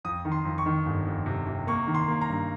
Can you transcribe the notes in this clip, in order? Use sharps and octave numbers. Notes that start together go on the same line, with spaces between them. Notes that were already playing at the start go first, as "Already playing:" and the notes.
F2 D#6
D#3
C6
F2
C#6
D#3
G1
F2
C3
C3
A#3 C#6
D#3
C6
A#3
A#5
G2